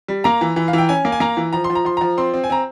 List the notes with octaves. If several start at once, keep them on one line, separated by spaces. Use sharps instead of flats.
G3
A#3 A#5
E3
E3
F5
E3 G5
C#4 G#5
A#3
G#5
A#3 A#5
E3
F3 A#5
C6
F3
A#5
F3 C6
F3 A#5
C4 C6
C4
G#5
C4 A#5